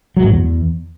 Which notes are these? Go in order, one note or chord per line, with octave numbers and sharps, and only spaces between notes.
F#3
G#2
E2